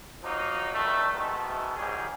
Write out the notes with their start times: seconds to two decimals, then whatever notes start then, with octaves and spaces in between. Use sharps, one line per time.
0.22 F3 F#3 A#3 D#4
0.73 G2 D#3 A3
1.12 G#2 B2 D#3 A3
1.76 A#1 G#2 C#4 G4 G#4